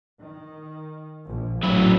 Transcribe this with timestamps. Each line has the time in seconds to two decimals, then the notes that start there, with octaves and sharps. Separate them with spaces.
0.21 D#3
1.26 A#1
1.63 A1 A2 F#3 E4